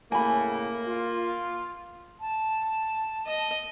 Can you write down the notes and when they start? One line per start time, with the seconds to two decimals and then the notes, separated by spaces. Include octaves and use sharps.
0.12 A2 C#3 A3 A#3 G#5 B5
0.86 F4
2.20 A5
3.27 D#5